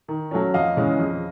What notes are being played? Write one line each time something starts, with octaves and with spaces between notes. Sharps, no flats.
D#3
F#3 A3 C#4
F2 D#5 F5
C#3 E3 G#3 C#4
F2